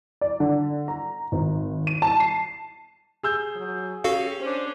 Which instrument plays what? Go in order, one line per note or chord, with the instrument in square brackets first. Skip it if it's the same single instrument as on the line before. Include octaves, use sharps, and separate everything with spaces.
[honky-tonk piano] D5
D3
A#5
G#1
D#7
A5
C7
[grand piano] G#4 E6 G6
[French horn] F#3
[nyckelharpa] C#4 [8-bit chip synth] F#4 A4 F5 [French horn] G4
[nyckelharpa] C#4 D4 [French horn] C5